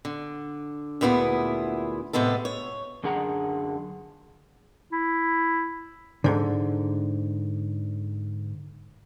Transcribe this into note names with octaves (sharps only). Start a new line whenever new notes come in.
D3
D2 A#2 B3 E4 G4 G#4
A2 C3 G#3 B3 A4
C#5
F#2 D3 G#4 F#5 A#5
E4
G#2 D3